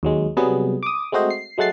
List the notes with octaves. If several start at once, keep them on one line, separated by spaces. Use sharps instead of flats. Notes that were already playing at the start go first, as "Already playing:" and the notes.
D#2 F#3 G#3
C3 F#3 G3 B3 G#4
D6 D#6
G#3 A3 C4 F#4 C5 D#5
C7
F#3 G#3 A3 F#5 A6 C7